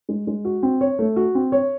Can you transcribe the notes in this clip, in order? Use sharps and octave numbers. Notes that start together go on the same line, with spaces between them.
G#3
G#3
F#4
C4
C#5
A3
F#4
C4
C#5